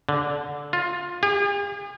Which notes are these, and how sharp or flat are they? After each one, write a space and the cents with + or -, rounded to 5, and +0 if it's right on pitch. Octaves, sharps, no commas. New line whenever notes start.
D3 -15
F4 +15
G#4 -45